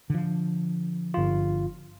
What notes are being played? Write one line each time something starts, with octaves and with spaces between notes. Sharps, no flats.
D3 F3
G1 F4